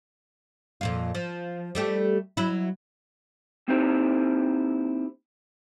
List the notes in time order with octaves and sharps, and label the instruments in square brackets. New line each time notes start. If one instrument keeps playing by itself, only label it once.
[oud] F2 A#2 F4
F3
G3 A3 G4
F#3 E4
[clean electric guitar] A#3 C4 D#4 E4 G4 C5